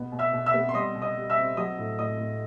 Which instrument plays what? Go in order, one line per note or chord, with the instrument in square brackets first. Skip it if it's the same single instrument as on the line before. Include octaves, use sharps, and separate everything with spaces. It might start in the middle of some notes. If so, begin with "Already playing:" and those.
Already playing: [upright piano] B2 B3
B2
E5 E6
B2
E5 E6
B3
C6
G3 D#5 D#6
B2
D#5 D#6
G3
E5 E6
C4
F#3 D#5 D#6
A2
A2 D#5 D#6
A2